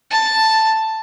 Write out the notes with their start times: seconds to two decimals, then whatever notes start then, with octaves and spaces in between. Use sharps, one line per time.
0.10 A5